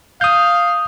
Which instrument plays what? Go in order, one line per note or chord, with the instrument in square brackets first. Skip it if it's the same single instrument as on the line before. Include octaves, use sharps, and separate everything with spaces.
[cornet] F5 [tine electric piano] D#6 G6